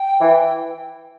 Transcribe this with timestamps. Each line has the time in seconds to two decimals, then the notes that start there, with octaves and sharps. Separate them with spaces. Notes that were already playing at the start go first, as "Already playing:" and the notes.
Already playing: G5
0.21 E3